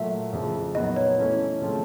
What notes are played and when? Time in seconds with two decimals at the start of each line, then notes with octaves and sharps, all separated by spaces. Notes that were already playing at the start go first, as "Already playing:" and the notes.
Already playing: A#2 F#3 A3 E5
0.33 F2 C#3 F3 A3
0.75 A#2 F#3 B3 D#4 D#5
0.96 C#5
1.18 E3 A3 C#4
1.61 C#3 F3 A3 C4